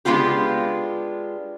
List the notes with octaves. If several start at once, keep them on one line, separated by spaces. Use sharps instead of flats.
G#3 B3 D4 F4 G4